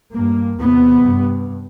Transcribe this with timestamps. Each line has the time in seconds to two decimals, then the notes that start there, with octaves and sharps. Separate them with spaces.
0.13 G2 A#3
0.59 E2 C3 B3
1.05 G2